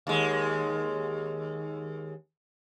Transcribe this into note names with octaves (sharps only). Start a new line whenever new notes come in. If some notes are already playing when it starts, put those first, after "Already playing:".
D#2 G#3